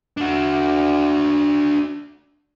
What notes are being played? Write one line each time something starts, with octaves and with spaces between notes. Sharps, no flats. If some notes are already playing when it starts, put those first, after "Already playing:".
D4 F#4